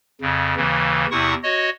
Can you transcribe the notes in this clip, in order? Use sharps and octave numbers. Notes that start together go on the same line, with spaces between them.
F2 C#3
D#2 C#3 E3
E2 C3 E4 F#5 C#6 D#6
F#4 C#5 D#5